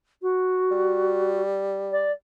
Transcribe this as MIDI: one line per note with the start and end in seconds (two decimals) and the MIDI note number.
0.22 1.42 66
0.71 2.09 55
1.92 2.12 74